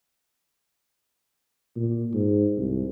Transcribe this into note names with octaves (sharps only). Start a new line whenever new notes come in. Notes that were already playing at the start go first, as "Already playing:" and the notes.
A#2
G#2
C2